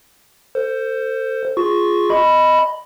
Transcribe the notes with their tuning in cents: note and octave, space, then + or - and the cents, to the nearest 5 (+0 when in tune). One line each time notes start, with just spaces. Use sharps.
A4 +35 C5 +0
F4 +0 G#4 +0 C#6 +0
D#5 +0 B5 +0